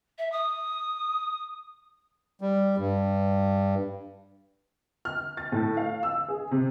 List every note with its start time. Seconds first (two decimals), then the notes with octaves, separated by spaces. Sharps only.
0.18 E5
0.31 D#6
2.41 G3
2.78 G2
5.05 F6
5.37 A6
5.52 A2
5.77 F5
6.03 E6
6.28 G#4
6.51 C3